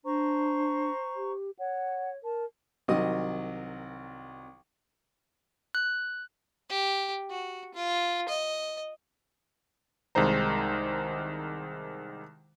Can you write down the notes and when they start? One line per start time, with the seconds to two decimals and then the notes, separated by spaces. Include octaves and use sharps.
0.05 D4 C5 A#5 C#6
1.16 G4
1.59 C#5 F#5
2.23 A#4 A5
2.88 C2 D#3 F#3 D#5 D#6
5.75 F#6
6.70 G4
7.30 F#4
7.74 F4
8.29 D#5
10.15 C2 D#3 G#3 C5 A#5